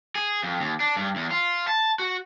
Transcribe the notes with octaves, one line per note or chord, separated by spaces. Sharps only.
G#4
F2
D#2
D4
G2
E2
F4
A5
F#4